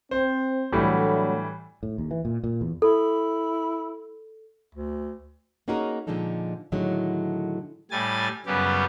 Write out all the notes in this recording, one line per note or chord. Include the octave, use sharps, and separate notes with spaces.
C4 C5
A2 D3 E3 F#3 G3 A3
A2
D#2
E3
A#2
A#2
E2
E4 A4
D2
A#3 C#4 D#4 F#4 G#4 A#4
A#2 D3 F3 G#3 D#4 A4
A2 D3 D#3 F#3 G#3
A2 G3 G#5 A6
F#2 C#3 G3 B3 G4